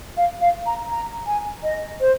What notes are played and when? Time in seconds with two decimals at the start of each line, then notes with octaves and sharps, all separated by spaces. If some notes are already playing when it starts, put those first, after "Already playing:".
0.17 F5
0.41 F5
0.66 A#5
0.90 A#5
1.27 G#5
1.63 D#5
2.01 C5